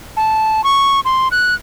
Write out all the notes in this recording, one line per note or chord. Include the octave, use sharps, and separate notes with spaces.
A5
C#6
C6
F#6